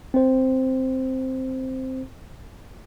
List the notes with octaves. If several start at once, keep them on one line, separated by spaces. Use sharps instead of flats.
C4 C5